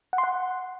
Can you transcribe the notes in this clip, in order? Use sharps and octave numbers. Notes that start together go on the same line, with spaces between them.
F#5
C6
F#5